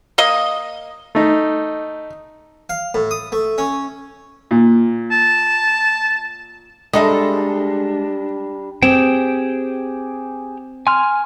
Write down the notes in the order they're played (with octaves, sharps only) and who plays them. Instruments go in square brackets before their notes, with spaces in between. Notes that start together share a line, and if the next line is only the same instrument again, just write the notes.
[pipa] A#3 D#5
[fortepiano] A3 D#4
[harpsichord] F5
A2
D#6
A3
C#4
[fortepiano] A#2
[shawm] A5
[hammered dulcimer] G3 A#5 [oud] G#3 A4 E5 [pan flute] D4 [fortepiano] D#5
[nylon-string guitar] C4 [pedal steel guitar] G4 G#4 G5 [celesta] E7
[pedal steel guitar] G#5 F6 [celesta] C6